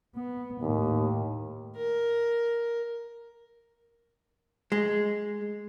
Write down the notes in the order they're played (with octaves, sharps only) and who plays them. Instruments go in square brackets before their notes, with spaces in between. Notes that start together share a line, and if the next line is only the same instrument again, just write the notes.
[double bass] B3
[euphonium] D#2 [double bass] A2
[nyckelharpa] A#4
[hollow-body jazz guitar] G#3